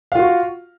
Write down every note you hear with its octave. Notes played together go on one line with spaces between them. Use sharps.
F4 F#4 F5